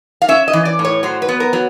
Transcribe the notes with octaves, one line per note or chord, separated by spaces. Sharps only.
F5
C#4 E5
D#5
E3
D5
A2
C#5
F#3 C5
B4
B3
A#4
F#3